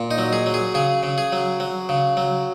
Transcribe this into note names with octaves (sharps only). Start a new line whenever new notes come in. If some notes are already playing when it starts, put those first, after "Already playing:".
Already playing: A#2
D#4
F#3
G#4
F#3
G#4
C#3 G#4
C#3
G#4
F#3
F#3
C#3
F#3